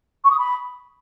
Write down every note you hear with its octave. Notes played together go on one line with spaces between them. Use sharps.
C#6
D#6
B5